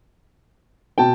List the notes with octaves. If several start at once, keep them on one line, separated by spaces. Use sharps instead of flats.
B2 G5 A5